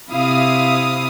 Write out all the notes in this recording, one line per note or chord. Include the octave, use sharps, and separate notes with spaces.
C3 E4 F5 D#6